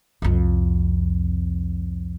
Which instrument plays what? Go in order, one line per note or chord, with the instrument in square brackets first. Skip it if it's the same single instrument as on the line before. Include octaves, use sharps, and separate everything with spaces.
[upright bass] C2 F2